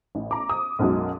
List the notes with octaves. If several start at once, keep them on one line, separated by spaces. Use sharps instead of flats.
A1
A#5 D6
D#6
B1 F#2 F#3 G#3